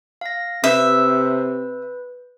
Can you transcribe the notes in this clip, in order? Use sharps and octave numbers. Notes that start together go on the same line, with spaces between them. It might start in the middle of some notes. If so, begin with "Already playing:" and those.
F5 A#6
C3 B4 E5 G6